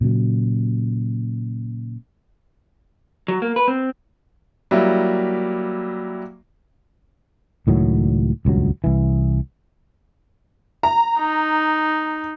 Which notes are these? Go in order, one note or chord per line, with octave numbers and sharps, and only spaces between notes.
A#2 C#3 F#3
F#3
A#3
B4
C4
F#3 G3 A#3 E4
C#2 A2 D#3 F#3
D#1 C#2 G2 F#3
C2 E3
A#5
D#4